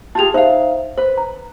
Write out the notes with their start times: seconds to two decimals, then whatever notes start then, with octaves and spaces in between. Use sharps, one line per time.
0.15 F4 G4 G#4 A5 F7
0.34 D#4 C5 E5 F5
0.97 B4 C5
1.18 A#5